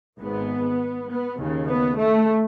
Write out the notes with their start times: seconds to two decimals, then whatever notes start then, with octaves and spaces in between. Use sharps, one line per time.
0.17 G#1 G#2 B3
1.07 B3
1.37 D#2 C#3
1.67 B3
1.97 A3